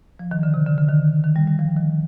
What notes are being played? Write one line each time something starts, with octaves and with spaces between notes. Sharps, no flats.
F3
D#3
D3
C3
D3
D3
D#3
D#3
G3
G3
F3
D#3